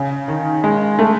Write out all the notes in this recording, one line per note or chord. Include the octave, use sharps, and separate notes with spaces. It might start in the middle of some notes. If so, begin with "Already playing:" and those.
Already playing: C#3
D#3
G#3
A3